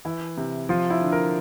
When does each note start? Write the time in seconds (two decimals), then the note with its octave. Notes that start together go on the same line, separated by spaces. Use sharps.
0.05 E3 E4
0.37 C3
0.69 F3 F4
0.90 E4
1.01 D3
1.12 A#4